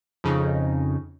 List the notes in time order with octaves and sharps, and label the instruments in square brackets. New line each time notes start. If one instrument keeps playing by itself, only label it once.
[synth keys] F2 C#3 D#4